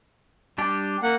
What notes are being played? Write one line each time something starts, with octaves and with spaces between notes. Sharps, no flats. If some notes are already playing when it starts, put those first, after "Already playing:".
G3 D4 G4
A#3 F#5